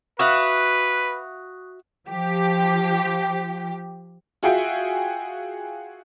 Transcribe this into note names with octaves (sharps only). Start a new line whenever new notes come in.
F#4 B4 E5 F5 C#6 D#6 F#6
F3 G4
F4 F#4 G#4 E5 G5 G#5